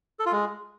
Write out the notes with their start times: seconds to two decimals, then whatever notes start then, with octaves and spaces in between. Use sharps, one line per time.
0.19 A4
0.26 F4
0.32 G#3